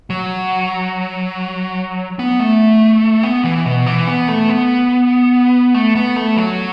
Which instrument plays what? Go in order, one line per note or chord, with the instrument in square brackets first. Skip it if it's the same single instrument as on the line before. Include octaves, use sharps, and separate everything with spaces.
[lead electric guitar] F#3
B3
A3
B3
E3
B2
E3
B3
A3
B3
A3
B3
A3
F#3